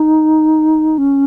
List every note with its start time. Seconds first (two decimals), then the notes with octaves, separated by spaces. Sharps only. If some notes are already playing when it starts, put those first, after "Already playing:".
Already playing: D#4
0.98 C#4